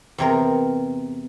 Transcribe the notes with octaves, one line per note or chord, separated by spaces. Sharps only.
E2 C3 A#4